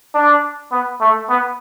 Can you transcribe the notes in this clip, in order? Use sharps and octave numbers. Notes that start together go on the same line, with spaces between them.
D4
B3
A3
B3